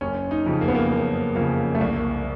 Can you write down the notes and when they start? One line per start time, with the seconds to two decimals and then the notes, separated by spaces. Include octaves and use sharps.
0.01 F#1 C#4
0.31 D#4
0.46 F2 C#3
0.61 A#3
0.68 B3
0.75 A#3
0.91 F#1
1.35 F2 C#3 A#3
1.75 A3
1.80 C2 A#3